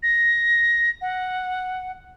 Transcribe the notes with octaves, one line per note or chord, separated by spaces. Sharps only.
A#6
F#5